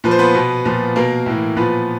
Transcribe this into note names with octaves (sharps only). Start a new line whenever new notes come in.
A#2 F3 B4
C5
B3 B4
B2
A#2 F3
B2 A#3 A#4
A2 E3
A#2 F3 B3 B4